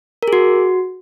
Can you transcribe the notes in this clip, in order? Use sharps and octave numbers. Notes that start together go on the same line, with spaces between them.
A#4
G#4
F#4